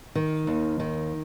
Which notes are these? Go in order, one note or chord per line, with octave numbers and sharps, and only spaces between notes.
D#3
D#2
D#3